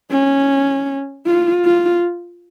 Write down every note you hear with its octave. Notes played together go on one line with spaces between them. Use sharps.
C#4
F4
F4